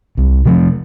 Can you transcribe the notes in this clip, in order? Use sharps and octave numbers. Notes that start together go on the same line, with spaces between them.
C2
C3 F3 C4